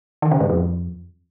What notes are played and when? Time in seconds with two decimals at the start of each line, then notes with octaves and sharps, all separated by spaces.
0.22 D#3
0.31 C#3
0.40 G#2
0.50 F2